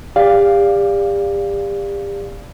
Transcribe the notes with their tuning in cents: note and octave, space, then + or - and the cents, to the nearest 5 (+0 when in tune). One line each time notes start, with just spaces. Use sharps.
G4 +35 D5 +0 F5 +0